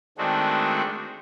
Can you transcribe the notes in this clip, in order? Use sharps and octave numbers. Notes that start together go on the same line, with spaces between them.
D#3 G#3 A3 C4 D4 F#4